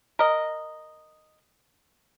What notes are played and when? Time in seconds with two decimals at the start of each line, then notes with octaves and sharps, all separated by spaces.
0.19 A#4 D#5